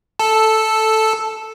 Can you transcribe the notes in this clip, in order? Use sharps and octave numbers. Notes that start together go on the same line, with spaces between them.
A4